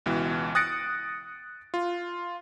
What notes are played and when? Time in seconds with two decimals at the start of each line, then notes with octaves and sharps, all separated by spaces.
0.06 C#2 B2 E3
0.55 D#6 F#6 A6 A#6 C#7 D7
1.74 F4